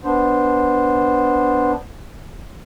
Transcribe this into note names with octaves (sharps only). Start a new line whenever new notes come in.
B3 D4 C5